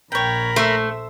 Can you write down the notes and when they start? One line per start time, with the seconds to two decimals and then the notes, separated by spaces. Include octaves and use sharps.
0.12 A#1 A#4 C#5 G5 B5
0.56 A3 C5 E5